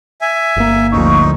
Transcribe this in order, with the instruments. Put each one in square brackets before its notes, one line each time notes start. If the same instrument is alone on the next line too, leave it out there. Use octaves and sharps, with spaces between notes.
[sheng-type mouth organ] E5 G#5
[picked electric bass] G1 A#3
[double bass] D2 F3 [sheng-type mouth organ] D#4 [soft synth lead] C#6